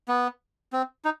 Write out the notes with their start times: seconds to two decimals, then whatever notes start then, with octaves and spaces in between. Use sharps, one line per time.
0.08 B3
0.73 C4
1.05 D#4